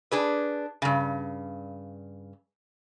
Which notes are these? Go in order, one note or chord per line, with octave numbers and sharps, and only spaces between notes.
D4 G#4 B4
G2 C#3